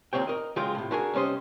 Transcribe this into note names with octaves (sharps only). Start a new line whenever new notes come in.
D#2 A#2 G#3 C4 C#5 G5
A#4 D#5
C#3 F#3 G#3 F4 G5
A2 C3
D4 E4 F#4 G#4 A#4 G#5
C3 G3 C#4 C5 D#5